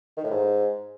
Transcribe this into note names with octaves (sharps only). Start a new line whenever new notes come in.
D#3
A2
G#2